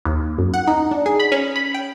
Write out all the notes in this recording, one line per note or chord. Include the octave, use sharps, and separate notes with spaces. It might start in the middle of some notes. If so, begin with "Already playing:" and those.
D#2
F#2
F#5
D#4
D4
G#4
B5
C#4
B5
G5